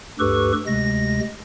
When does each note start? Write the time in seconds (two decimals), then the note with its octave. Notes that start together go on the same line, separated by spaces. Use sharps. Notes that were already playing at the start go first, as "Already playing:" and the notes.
0.19 D2 G2 G4 A4 B4 C#6
0.66 D2 C3 G#3 A#6